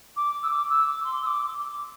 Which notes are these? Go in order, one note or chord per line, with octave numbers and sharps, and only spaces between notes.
D6
E6
D6
E6
D6
C6
E6
D6